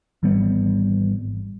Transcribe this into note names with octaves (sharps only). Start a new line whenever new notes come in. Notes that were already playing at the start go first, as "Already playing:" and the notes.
G#1 E3 G3 B3